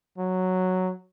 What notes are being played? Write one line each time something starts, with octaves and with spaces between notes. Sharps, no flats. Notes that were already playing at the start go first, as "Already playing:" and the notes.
F#3